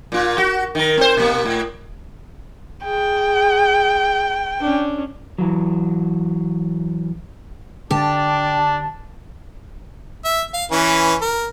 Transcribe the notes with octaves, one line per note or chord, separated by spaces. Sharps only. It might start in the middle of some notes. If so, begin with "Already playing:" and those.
A#2 F4
F#4
D#3 A#4
C4 C5
B2 A#3
A2
G#4 G5
C#4 D4
E3 F#3
D3 D4 G4 A5
E5
F5
E3 C#4 B4
A#4